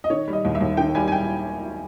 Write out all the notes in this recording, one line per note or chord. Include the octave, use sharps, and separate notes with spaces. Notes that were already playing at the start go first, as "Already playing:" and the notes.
D#5
D#3 C#5
G3
D#5
D#2
E5
D#2
D#3 G5
G3 G#5
G#5
G5